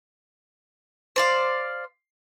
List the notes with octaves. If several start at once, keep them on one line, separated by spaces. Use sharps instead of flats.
C5 D5 F5